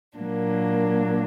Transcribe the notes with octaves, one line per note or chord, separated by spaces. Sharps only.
A#2 F#3 A#3 D4